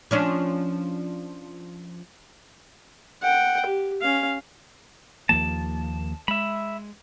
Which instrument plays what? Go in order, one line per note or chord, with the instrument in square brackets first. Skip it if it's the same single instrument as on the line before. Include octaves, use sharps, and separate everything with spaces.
[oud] F3 C#4 D4
[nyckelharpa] F#5 G5
G4
C#4 F5
[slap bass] D#2 F3 A#3 [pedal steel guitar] A5
[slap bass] G#3 [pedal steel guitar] E5 B5